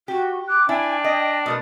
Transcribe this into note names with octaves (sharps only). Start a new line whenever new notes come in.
F#4 G4
D6 F#6
D4 E4 G5 G#5
D#5 A#6
B2 A3 A#4 D#6